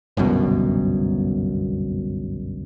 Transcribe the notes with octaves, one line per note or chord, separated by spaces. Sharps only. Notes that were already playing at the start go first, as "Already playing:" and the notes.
G1 C2 F#2 B2